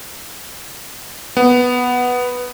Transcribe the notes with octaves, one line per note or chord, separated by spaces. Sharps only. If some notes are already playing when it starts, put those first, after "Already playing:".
B3